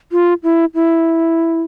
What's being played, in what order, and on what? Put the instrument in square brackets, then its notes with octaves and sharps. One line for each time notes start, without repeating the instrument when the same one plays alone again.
[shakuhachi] F4
E4
E4